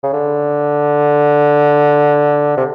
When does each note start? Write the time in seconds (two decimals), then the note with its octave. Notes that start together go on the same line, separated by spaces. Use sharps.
0.03 C#3
0.13 D3
2.57 C3